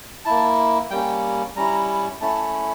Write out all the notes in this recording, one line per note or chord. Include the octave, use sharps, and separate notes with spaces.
A#3 E4 A5
G3 A#3 C#4 G5
G3 C#4 E4 A#5
A3 C#4 E4 A5